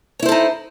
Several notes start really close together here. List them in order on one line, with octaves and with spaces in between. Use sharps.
C#5 E4 C5 A4 D#4